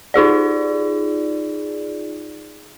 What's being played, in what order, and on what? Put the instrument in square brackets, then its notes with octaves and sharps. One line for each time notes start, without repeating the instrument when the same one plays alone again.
[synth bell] D#4 F4 G#4 D5